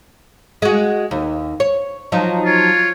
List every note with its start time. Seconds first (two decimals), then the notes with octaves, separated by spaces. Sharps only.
0.62 G#3 F#4
1.11 D#2
1.60 C#5
2.12 F3 F#3 D#4
2.45 F4 C#5